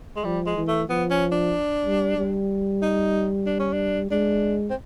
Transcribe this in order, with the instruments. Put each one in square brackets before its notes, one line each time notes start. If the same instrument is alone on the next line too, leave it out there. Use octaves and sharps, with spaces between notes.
[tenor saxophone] G#3
[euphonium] F3 [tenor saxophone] G3
[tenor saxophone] G#3
[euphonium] E3
[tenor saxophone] A3
[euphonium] F3 [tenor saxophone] B3
[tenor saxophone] C#4
D4
[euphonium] G3
G3
[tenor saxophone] D#4
D4
C#4
D4
[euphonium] G#3 [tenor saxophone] D4
[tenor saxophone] C4